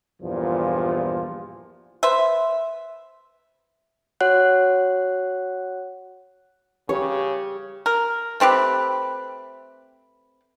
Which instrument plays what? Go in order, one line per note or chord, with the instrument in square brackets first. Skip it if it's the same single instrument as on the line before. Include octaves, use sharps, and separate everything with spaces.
[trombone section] E2 G2 A#2 F3
[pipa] B4 C5 E5
[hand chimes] F#4 C#5 F#5 F#6
[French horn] C#3 [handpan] G4 [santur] C#5
[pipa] A#4
A3 C4 G4 B4